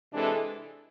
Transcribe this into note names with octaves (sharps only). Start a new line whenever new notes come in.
C3 E3 G#3 D4 A4